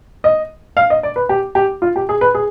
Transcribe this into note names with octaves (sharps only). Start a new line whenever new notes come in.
D#5
F5
D#5
D5
B4
G4
G4
F4
G4
G#4
B4
G#4